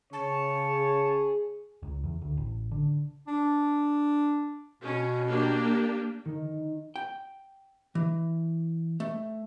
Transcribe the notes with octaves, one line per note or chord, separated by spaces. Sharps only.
C#3 C#5 A5
G#4
C#2
E2
D2
A1
D3
D4
B2 C#4
A#3 D4 G4
D#3
G5
E3
A3